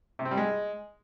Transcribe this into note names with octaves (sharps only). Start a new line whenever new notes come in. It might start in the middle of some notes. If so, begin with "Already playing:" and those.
C3
C4
G3
G#3